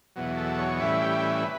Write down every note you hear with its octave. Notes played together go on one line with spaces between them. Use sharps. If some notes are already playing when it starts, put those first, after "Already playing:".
E2 B2 F#3
A4
C#5
A2 E3 G3 C#4 E4 B4
G4
B4